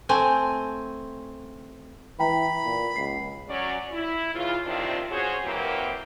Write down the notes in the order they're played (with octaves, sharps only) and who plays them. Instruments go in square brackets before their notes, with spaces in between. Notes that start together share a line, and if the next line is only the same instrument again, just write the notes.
[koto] A3 C4 G#5
[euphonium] E3 [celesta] G5 A#5 [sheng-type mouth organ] B5
[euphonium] A#2
[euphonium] C#2 [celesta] C7
[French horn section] F#3 C#4 D5
E4
C#3 E3 F4
C3 D#3 C4 D4 E4 F4
C#4 F#4 G#4 C5 C#5
E3 F#3 A#3 C4 G4 A#4